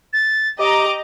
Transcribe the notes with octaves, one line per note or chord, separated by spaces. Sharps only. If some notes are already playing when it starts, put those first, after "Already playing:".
A6
G4 D#5 A#5 D6